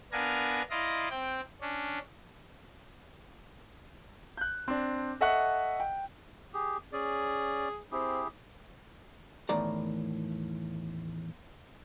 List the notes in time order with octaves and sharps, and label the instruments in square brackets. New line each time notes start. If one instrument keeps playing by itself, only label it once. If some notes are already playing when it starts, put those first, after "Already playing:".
[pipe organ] B3 D4 A#4 F5 G#5 A#5
E4 D5 D#5 F5 A#5 C6
C4 G5
C#4 D4
[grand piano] F#6 G6
C4 D4
A4 D#5 E5 F#5 C#6 F#6
G5
[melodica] G4 G#4
[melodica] C#4 D5 [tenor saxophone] G#4
[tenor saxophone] C4 [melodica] E4 G4 G#4
[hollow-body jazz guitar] E2 A2 D#3 D5 A#5